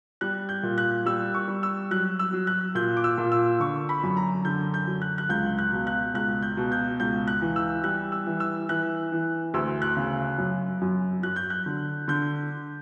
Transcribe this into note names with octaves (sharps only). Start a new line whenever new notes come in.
G3 F#6
G6
A#2
F#6
G3 E6
C#6
G3
E6
F#3 F#6
E6
F#3
F#6
A#2 G6
D6
E6
A#2
E6
D3 C#6
B5
F#2
A#5
D3 G6
G6
F#3
F#6
F#6
C#2 G6
F#6
B2
F#6
C#2 F#6
G6
B2
G6
C#2 G6
F#6
E3
E6
G3 F#6
E6
E3
E6
E3 F#6
E3
D2 E6
F#6
C#3
F#2
F#2
F#3 F#6
G6
F#6
D3
D3 G6